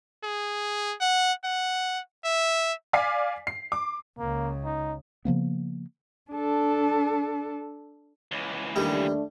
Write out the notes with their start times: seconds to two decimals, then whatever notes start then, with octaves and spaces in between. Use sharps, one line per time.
0.24 G#4
1.01 F#5
1.44 F#5
2.25 E5
2.93 D5 F5 G#5 D6 B6 C7
3.47 C7
3.72 D6
4.18 C#2 C#3 A#3
4.65 D#4
5.25 C#3 F3 A#3 B3
6.31 D4 A4
8.31 C#2 E3
8.76 D#2 G3 A3 D4 A#5